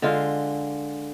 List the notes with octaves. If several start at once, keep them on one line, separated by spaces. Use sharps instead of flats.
D3 G#3 F4